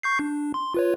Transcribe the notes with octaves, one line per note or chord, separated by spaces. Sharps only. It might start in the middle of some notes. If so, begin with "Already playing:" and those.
C#6 G6 C7
D4
C6
F4 B4 C#5